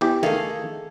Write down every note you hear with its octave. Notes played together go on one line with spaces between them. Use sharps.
E2 E3 G4
D#3 A3 G#4 A4 F5